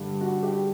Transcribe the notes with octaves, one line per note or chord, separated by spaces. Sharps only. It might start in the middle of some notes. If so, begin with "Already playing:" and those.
Already playing: G2 D3 G3
F#4
G4